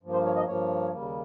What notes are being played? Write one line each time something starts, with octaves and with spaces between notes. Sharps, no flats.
G2 F3 A#3
C5
C#5
D#5
G2 F3 A#3 C#5
D#2 C#3 G3 A#3